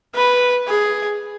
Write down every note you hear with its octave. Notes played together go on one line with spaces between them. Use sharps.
B4
G#4